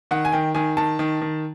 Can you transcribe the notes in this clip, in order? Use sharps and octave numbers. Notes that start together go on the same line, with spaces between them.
D#3 F#5
G#5
D#3 G5
D#3 G#5
D#3 A5
D#3
D#3